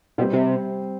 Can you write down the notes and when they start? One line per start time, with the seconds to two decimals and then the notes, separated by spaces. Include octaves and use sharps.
0.18 B2 G3 C4 G4 C5
0.33 C3